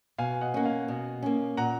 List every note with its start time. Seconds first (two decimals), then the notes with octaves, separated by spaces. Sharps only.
0.18 B2 F5 G#5
0.41 D#5 F#5
0.54 A#3 C#4 F#5
0.65 F5 G#5
0.88 B2
1.23 A#3 C#4
1.57 A#2 F#5 A#5